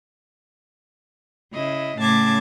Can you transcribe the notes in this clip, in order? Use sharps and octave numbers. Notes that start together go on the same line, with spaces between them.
C#3 E4 D#5
A2 C#3 A5 D6 G#6